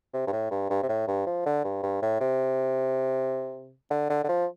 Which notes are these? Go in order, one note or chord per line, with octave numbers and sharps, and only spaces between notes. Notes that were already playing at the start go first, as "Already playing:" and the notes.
C3
G2
A2
G2
G2
C3
A2
G2
F3
D3
G2
G2
A2
C3
D3
D3
D3
F3